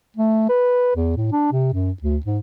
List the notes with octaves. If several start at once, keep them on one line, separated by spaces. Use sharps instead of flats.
A3
B4
E2
A2
D4
C3
F#2
D2
G#2